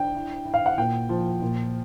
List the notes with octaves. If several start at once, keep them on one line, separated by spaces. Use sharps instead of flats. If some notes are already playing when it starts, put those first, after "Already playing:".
Already playing: D4 G5
E4
E4
F5
F#5
A#2 G5
F3
A#2